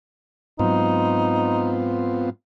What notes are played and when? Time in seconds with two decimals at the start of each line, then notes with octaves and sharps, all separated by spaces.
0.59 G#2 F#3 B3 C4 D#4 F4